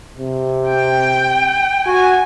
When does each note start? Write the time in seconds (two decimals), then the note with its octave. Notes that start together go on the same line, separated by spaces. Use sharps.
0.19 C3
0.68 G5
1.86 F#4 G#5